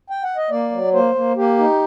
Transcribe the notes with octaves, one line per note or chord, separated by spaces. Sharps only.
G5
F#5
D#5
A#3 D5
F#3
A#3 C5
A#3
A#3 G4
D#4